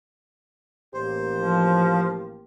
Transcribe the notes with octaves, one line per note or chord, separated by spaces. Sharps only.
A1 A#3 G4 C5
F3